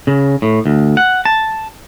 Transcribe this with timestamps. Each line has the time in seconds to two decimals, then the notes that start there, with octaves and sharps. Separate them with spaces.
0.07 C#3
0.42 A2
0.66 D2
0.97 F#5
1.25 A5